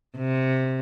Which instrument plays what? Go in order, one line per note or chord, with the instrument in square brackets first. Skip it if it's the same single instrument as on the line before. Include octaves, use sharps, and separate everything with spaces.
[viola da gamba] C3